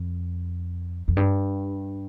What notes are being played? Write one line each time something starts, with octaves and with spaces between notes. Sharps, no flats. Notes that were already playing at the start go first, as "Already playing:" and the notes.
Already playing: F2
F2
G2